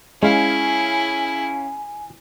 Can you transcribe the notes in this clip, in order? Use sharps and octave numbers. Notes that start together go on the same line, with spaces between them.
G#3 C#4 E4 G#4 F5 G#5